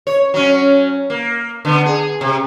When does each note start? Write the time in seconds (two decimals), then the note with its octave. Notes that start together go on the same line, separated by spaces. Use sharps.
0.07 C#5
0.34 F#3 C#4
1.10 A#3
1.65 D3 B3
1.86 G#4
2.21 C3